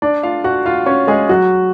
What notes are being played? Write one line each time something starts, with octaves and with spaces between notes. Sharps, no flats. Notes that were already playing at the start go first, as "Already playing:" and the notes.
D4 D5
F4 F5
F#4 F#5
F4 F5
C#4 C#5
G#3 G#4
F#3 F#4